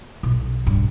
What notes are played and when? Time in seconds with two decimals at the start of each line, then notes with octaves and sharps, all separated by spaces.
0.23 B1
0.67 G2